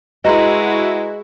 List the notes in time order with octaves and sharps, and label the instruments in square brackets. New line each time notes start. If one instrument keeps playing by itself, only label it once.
[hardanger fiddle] G#3 [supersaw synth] E4 F#4 [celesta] B4 A#5 C6 [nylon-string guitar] D#5 F#5